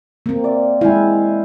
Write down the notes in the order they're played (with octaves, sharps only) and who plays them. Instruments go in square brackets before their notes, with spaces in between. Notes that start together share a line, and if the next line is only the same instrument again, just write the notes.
[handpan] A#3 C4
[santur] D5 E5
[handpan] G#3 E4 [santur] F5 G5 G#5